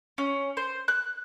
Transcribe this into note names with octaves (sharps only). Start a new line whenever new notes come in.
C#4
C5
F#6